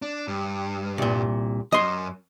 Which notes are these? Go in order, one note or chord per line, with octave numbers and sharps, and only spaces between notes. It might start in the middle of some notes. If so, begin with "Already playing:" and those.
D4
G2
C2 A#2
F#2 D#5 C6